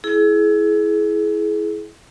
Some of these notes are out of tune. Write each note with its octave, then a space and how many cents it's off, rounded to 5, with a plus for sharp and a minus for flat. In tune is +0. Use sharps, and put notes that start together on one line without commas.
E4 +0 G#4 +30